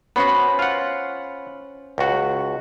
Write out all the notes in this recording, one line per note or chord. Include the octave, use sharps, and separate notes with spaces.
B3 C#4 F#4 C5 B5
F4 F#5
C#2 F#4